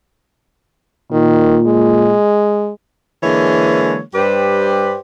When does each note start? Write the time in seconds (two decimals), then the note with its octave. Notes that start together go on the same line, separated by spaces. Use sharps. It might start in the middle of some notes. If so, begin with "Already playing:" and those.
1.12 A#2 D#3
1.67 G#3
3.23 D3 E3 G#3 A#3 C#5
4.14 G2 G4 B4 C5 D5